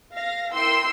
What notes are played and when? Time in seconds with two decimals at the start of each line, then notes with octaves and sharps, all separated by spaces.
0.14 F5 A#6
0.54 E4 A#4 G5 C6 E6